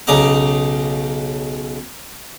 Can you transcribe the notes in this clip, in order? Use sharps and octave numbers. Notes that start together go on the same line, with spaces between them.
B1 C#3 D#5 A#5 D6